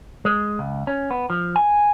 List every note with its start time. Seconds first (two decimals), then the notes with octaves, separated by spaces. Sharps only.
0.25 G#3
0.59 C#2
0.87 C#4
1.11 B3
1.30 F3
1.56 G#5